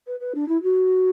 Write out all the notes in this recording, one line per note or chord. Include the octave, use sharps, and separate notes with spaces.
B4
B4
D4
E4
F#4